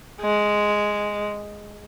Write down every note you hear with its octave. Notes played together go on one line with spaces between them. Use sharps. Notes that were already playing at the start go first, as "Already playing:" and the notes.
G#3